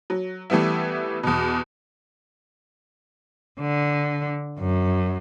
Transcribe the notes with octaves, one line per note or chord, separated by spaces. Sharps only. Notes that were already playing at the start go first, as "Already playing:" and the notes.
F#3
E3 G3 A3 B3 E4
E2 B2
D3
F#2